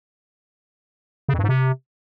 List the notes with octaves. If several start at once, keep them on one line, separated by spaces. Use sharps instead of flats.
C#3
F2
G2
G#2
C3